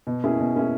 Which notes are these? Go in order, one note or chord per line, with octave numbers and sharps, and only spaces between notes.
B2
A#3 C#4 E4 G#4
B2
A#3 C#4 E4 G#4